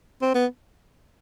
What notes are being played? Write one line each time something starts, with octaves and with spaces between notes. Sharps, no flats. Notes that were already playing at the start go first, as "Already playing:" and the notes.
C4
B3